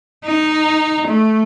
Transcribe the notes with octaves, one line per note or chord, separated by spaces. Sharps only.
D#4
A3